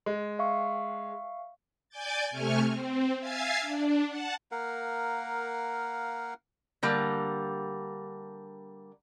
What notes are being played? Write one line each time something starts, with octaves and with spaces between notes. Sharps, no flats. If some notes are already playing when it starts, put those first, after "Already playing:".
G#3
E5 F5 C#6
D5 G#5 D6 G6 A6
C3 A3 G#5 C#6 F6
C4
E5 F5 G#5 G#6 A6 C7
D4
F#5 A5
A#3 A#4 F5 F#5
D3 G3 A#3